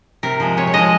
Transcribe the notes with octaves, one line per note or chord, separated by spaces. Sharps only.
C3 A#4
F3 G#3
C3 C#5
C#5
F3 G#3 D#5